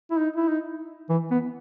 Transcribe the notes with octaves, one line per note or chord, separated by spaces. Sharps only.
E4
D#4
E4
D#4
E3
B3